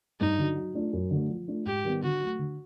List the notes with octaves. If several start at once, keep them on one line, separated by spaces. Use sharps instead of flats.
G2 D#4
D3 F#3
F#3
A3 D4 F4
F#2
D3 F#3 A3
F3
A3 D4 F4
G#2 G4
D#3 G3 B3
D3 F#4
F#3 A3
D3